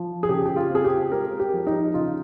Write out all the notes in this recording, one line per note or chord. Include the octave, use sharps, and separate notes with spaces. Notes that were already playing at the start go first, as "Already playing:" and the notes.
Already playing: F3
G#4
C#3 G4
G4
F4
C4
G#4
G4
G#3 A#4
G4
F3
D#4
C#3 F4